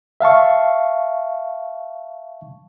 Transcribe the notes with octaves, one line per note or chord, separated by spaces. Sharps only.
E5 F5 A5 C#6